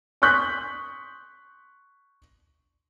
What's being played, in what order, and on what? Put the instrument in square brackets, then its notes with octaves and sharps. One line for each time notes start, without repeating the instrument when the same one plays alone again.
[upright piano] C6 C#6 D#6 F#6 G6 B6